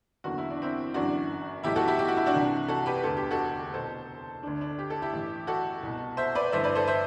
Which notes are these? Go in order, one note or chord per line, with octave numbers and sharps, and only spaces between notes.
F#1 E2 D3 F#4
E4
D4
C4 E4
G1 F#2 E3 D4 F#4
B1 A2 E3 E4 G4
F#4 A4
E4 G4
G4
F#4
E4
D4 F#4
C2 C3 E3
F#4 A4
G4 B4
E1 D2 D3 A4
G4
F#4 A4
C2 B2 A4 C5
D2 D3 D4
D4
G4
A4
E4 G4
A1 A2 E3
F#4 A4
C2 B2
C5 E5
B4 D5
A1 G2 D3 C5 E5
B4 D5
A4 C5
C5 E5